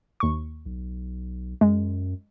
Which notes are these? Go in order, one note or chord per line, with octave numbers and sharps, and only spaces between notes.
D#2 C#6
B1
F#2 G#3